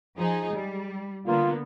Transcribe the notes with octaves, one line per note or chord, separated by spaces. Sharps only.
F3 D#4 G#4
G3
D3 A#3 B3 F4